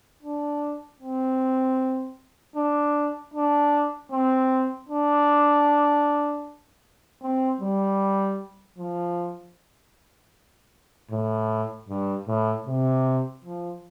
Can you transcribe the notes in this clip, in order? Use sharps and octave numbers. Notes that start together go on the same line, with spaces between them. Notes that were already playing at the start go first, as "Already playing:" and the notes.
D4
C4
D4
D4
C4
D4
C4
G3
F3
A2
G2
A2
C3
F3